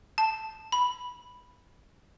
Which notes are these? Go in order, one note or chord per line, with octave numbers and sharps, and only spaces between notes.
A5
B5